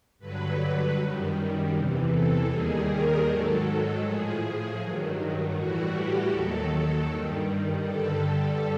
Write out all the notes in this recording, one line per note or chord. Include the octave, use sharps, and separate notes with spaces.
G2 D3 F#3 B4
F#2 D#3 G3
E2 C3 E3
A4
D#2 D#3 G3 G#4
A#4
G#2 D#3 F#3 A4
A2 F3 G#4
G2 D#3 F#3
A2 E3 G3 F#4
G4
D#2 D#3 F#3 A4
A4
G2 D#3 G3
G2 D3 G3 A4